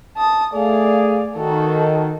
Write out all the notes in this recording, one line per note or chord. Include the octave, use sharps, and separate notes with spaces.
A5 D#6
A3 G#4 D5 F5
D#3 F#4 A4